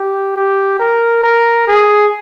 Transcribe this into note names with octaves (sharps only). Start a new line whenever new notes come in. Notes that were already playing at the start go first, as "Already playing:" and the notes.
Already playing: G4
G4
A#4
A#4
G#4